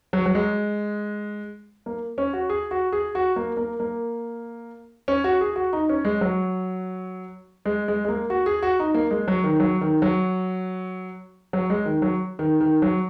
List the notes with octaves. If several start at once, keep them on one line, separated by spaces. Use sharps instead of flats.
F#3
F#3
G#3
A#3
C#4
F#4
G#4
F#4
G#4
F#4
A#3
A#3
A#3
C#4
F#4
G#4
F#4
D#4
C#4
G#3
F#3
G#3
G#3
G#3
A#3
F#4
G#4
F#4
D#4
A#3
G#3
F#3
D#3
F#3
D#3
F#3
F#3
G#3
D#3
F#3
D#3
D#3
F#3